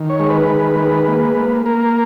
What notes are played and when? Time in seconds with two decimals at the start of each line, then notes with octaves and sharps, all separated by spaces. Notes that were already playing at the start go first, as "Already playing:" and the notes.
Already playing: D#3
0.10 C#5
0.20 G#3
0.30 B4
0.49 D#3
0.78 G#3
1.08 A#3
1.36 A#3
1.66 A#3 A#4